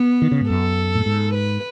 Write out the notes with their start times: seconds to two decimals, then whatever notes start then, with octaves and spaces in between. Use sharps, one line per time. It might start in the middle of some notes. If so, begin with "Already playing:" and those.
Already playing: B3
0.22 D#3
0.31 C#3
0.41 G#2
0.49 F#2 A4
0.95 A2
1.06 G#2
1.34 B4